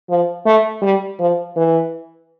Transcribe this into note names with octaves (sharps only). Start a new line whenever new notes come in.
F3
A3
G3
F3
E3